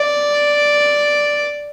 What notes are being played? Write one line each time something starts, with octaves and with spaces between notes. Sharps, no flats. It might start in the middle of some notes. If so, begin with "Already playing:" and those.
Already playing: D5